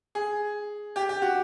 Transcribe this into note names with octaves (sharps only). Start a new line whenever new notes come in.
G#4
G4
G4
F#4